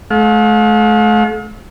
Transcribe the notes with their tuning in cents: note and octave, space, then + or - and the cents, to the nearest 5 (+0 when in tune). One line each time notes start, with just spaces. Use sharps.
A3 -40 F5 +40